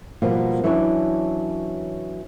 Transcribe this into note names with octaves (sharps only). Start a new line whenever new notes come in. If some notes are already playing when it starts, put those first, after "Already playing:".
B2 F3 G3 A#3 B3
E3 F#3 C#4 D4 C#5